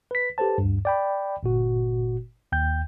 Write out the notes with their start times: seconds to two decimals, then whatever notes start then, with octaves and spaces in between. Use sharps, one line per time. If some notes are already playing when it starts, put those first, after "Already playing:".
0.11 B4 B6
0.38 G4 A4 B4 C5 A5
0.58 D2 G2
0.85 D5 G5 B5
1.43 G1 A#2 F#4
2.52 D#2 G5 G6